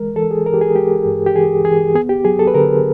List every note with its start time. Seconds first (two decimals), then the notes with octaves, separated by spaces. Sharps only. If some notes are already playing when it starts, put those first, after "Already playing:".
Already playing: E3 G#3 A#4
0.16 E3 A4
0.31 G#4
0.46 E3 A#4
0.54 G4
0.61 G#4
0.75 G#3 G4
1.06 G2
1.26 G4
1.35 E3 G#4
1.65 E3 G#4
1.95 B3 G#4
2.09 G4
2.25 F#3 G#4
2.39 A4
2.47 B4
2.54 D3 A#4